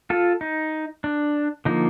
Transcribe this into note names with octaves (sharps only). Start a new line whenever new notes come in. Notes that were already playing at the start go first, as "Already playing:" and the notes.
F4 A4
D#4
D4
D3 F3 A#3 D#4